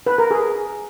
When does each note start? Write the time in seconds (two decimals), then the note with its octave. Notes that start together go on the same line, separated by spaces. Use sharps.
0.06 B4
0.18 A#4
0.31 G#4